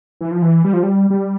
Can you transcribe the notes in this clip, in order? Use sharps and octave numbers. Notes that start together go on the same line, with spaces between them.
E3
F3
E3
G3
F3
G3
G3